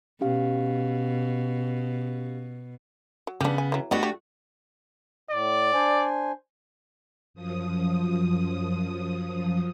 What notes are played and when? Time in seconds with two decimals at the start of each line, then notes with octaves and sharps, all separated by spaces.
0.21 B2 C#4 G4 F5
3.27 F#3
3.41 C#3 B3 D4 G4
3.58 G#5
3.72 E3 F#3
3.91 A3 B3 D4 F#4 G4 D#5
4.03 G4
5.30 A2 D5
5.74 D4 C5 G#5
7.34 F#2 F3 D#6